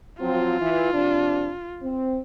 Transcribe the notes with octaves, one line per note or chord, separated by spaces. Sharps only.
F3 F#3 C4 F4
E3
F2 C3 D4
C4